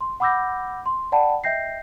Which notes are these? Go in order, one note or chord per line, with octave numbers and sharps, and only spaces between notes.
C6
F#5 B5 D6 E6 G6 A#6
C6
D5 F#5 G5 A5 B5
D#5 E5 G5 G6 A#6 C7